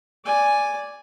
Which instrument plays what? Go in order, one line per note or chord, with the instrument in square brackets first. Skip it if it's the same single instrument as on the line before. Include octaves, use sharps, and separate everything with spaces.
[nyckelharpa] D5 G#5